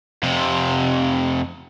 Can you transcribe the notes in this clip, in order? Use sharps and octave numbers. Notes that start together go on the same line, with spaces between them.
F2 C3